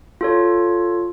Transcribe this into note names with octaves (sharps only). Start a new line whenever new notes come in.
F4 A4 C#5